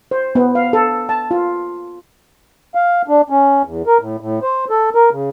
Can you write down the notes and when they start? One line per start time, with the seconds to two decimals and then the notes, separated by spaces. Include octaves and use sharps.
0.11 C5
0.35 B3
0.55 F5
0.73 A4
1.09 A5
1.31 F4
2.75 F5
3.08 D4
3.30 C#4
3.65 E2
3.87 A#4
4.01 A2
4.21 A2
4.42 C5
4.70 A4
4.95 A#4
5.11 C#3